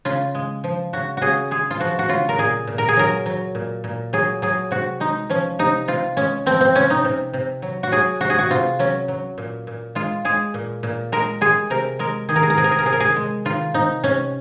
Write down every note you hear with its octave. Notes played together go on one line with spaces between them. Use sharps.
C#3 F4
G#3
F3
C#3 F#4
C#3 F#4 G#4
G#3 G#4
F4
F3 F#4
F#4
C#3 F4
A#4
A#2 G#4
A#2
A#4
G#4
F#3 A#4
F#3
A#2
A#2
F#3 G#4
F#3 G#4
C3 F#4
G#3 D#4
F3 C#4
C3 D#4
C3 F4
G#3 C#4
F3 C4
C4
C3 C#4
D#4
C3
C3
F#3
F#4
F#3 G#4
C3 F#4
G#4
F#4
C3 F4
F#3 C#4
F#3
A#2
A#2
G#3 F4
G#3 G#4
A#2
A#2
G#3 A#4
G#3 G#4
C3 A#4
G#3 A#4
D#3 G#4
A#4
G#4
A#4
C3 G#4
A#4
G#4
A#4
C3 G#4
A#4
G#4
G#3
D#3 F4
C3 D#4
C3 C#4